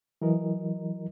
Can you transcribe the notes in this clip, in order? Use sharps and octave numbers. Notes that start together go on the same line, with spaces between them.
E3 F#3 A#4 D#5